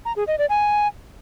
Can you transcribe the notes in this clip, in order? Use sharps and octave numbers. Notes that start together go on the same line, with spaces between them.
A#5
G#4
D#5
D5
G#5